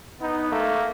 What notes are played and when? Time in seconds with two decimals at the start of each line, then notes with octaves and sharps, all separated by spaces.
0.21 B3 D#4
0.52 A3 A#3